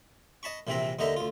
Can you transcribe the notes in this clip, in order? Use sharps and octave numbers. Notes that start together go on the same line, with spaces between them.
D#5 A5 B5 C#6
A#1 C3 E3 C4 E5 A#5
D#2 D3 D#4 D#5 E5 A#5
D2 F4